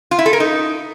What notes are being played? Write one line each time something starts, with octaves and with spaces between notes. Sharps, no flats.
F4
E4
A4
A#4
D#4